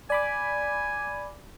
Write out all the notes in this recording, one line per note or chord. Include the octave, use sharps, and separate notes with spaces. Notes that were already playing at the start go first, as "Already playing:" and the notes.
D5 G#5 B5 D6